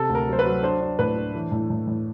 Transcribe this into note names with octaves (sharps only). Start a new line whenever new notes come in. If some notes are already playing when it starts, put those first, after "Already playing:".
Already playing: C3 A4
D2
A#4
F#3 C5
B4
F#3
D4 C5
D4
A2 B4
D4
E3
A2
A2
A2